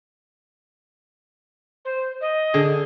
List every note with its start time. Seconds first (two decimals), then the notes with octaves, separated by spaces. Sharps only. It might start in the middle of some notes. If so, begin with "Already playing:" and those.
1.84 C5
2.20 D#5
2.54 D3 G#4